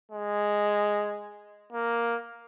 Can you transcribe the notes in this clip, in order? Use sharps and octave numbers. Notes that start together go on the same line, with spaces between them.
G#3
A#3